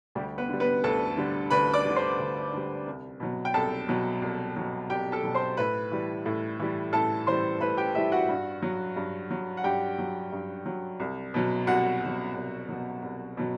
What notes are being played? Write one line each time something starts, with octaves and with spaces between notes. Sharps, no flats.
D2 G3 G4
B3 B4
D3 G3
B3 B4
D2 A4 A5
D3 G3
D2 B4 B5
D5 D6
D3 G3
C5 C6
D2
D3 G3
C2
B2 F#3
G5
C2 A4 A5
B2 F#3
C2
B2 F#3
C2 G4 G5
A4 A5
B2 F#3
C5 C6
A2 B4 B5
E3 G3
A2
E3 G3
A2 A4 A5
E3 G3 C5 C6
A2 B4 B5
G4 G5
E3 G3 E4 E5
F#4 F#5
G2
F#3
G2
F#3
F#5
G2 G4 G5
F#3
G2
F#3
C2
B2 F#3
C2 F#4 F#5
B2 F#3
C2
B2 F#3
C2
B2 F#3